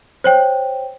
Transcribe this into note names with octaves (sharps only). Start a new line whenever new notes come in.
C5 C#5 G5